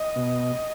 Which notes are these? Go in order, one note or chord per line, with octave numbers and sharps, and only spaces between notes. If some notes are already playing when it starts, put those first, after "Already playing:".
Already playing: D#5
B2